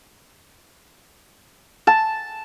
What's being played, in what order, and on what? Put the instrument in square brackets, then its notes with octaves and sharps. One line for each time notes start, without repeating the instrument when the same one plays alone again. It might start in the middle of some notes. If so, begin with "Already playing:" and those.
[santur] A5